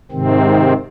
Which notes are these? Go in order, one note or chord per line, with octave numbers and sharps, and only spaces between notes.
G#2 C3 D#3 C4